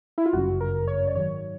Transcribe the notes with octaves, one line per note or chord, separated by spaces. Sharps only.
E4
F4
G1 F#2 C#3 F#4
A#4
C#5
D5
G#2 D#3 F#3 C#5